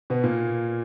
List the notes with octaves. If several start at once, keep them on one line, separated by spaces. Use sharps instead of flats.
B2 B3
A#2 A#3